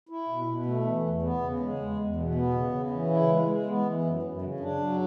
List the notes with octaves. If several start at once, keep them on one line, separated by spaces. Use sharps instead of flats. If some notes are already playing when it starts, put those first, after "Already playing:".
E4
B2
B2
A3
E3
E2
B3
C#3
G#3
E2
E2
B2
B3
C#3
C#3
E3
E4
G#3
G#3
B3
E3
F#2
F#2
C#3
D4
F#3